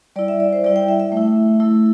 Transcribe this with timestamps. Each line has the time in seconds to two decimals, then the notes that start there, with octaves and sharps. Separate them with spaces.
0.16 G3 D5
0.19 E4
0.28 E5
0.40 D5
0.53 C5
0.64 G3 E4 D5
0.76 G5
0.88 E5
1.00 E5
1.12 A3
1.17 E4
1.60 A3 E4